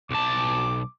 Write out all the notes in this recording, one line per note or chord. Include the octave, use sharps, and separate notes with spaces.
B1 A5 D6